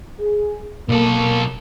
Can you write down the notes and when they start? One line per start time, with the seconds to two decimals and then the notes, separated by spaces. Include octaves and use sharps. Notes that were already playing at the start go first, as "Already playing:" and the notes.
0.20 G#4
0.89 B1 A#3 A4